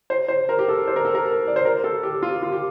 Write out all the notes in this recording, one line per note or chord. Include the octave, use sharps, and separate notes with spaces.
C5
C5
A#4
G4
A4
C5
A#4
A4
A#4
D5
C5
A#4
A4
G4
F4
F4
G4